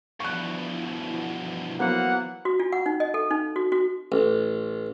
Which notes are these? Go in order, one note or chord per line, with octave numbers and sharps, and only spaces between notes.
G2 B2 E3 F3 E4 C#6 F#6
F#3 A#3 B3 C5 F#5
F#4
F4
F#5
D#4
D#5
A4
D#4
F#4
F#4
A1